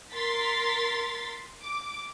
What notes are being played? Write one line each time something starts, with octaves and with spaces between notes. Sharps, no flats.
A#4 C6 A6 B6
D6